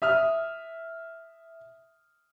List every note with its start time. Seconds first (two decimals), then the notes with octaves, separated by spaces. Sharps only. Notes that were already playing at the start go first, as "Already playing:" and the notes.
0.02 E5 D#6 F6